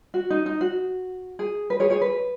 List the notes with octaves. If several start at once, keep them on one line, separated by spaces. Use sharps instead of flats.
F#4
D#4
D#4
F#4
G#4
B4
G#4 C#5
G#4 C#5
B4